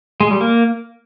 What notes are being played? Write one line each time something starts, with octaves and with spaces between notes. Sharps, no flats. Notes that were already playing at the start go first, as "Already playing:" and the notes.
G#3
G3
A#3